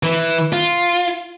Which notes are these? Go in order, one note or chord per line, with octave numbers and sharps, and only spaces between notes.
E3
F4